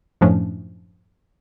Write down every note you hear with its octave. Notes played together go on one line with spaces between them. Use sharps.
F#2 A2 F3 A3 C#4 D4